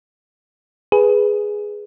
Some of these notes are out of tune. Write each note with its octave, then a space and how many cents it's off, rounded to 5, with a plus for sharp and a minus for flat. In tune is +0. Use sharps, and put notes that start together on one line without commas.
G#4 +0 B4 +0